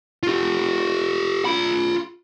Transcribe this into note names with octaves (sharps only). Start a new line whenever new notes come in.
F4 G4
F4 B5